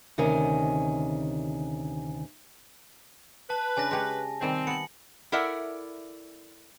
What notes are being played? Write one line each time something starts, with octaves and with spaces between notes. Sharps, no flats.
D2 C3 D#3 C#4 G#5
B4 A5
C#3 D4 G#5 A#6
G#3 G4 C#5 A#6
C3 D#3 G3 C4
B3 C#7 F#7
E4 A4 A#4 D5 E5 F#5